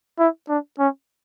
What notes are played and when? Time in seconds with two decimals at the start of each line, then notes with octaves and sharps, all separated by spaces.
0.19 E4
0.49 D4
0.79 C#4